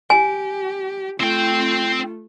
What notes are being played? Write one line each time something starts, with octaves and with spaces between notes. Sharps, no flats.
G4 G#5
A3 C4 F4 G5